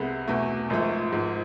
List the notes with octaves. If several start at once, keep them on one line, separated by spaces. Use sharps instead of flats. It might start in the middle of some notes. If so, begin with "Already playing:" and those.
Already playing: C2 C3 G#3 B3
E2 B2 A3
G#1 G#2 F3 A3
G#1 G#2 F3